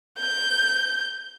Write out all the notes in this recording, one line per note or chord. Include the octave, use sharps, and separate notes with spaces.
G6